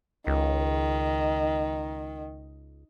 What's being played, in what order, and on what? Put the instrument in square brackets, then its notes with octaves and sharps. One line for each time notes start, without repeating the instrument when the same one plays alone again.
[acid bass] C#2 [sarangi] D#3